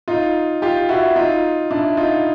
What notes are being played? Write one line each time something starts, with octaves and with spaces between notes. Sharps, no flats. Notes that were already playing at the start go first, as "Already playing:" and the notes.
D#4 F4
F4 G4
E4 F#4
D#4 F4
D4 E4
D#4 F4